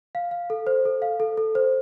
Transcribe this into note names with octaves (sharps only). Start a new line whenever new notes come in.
F5
F5
A4
C5
A4
F5
A4
A4
C5